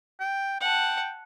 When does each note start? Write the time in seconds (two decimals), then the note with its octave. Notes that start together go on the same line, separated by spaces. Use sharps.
0.20 G5
0.61 F#5 G5 A5